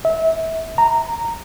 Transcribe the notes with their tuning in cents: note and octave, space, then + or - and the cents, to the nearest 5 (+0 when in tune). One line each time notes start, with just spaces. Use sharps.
E5 -25
A#5 -10